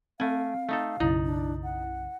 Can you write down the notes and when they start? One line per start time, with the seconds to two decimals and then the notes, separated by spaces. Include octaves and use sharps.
0.20 A3 C4 F5 G#5
0.69 A3 D#4 A4
1.00 B1 F#2 C#3 D#4 E4
1.25 D4
1.64 F#5